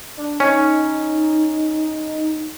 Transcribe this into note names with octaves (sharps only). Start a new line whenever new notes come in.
D4
C#4 D#4